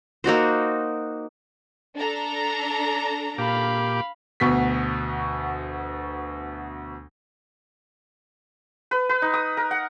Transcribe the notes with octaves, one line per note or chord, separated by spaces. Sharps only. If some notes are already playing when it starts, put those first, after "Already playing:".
A#3 D#4 F#4 C5
D4 A4 A#5
A#2 G4 F5 B5 D6
D2 B2 F#4 C#6 B6
B4
B4
D#4
D#6
A#4
F#5